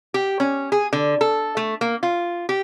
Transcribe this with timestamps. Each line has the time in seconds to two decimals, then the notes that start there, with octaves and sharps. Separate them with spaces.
0.14 G4
0.40 C#4
0.72 G#4
0.93 D3
1.21 A4
1.57 A3
1.81 A#3
2.03 F4
2.49 G4